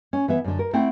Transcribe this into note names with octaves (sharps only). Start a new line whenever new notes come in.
C#4
E3 B3 E5
F#2 D3
A#4
A3 C4 E4 F#5 G5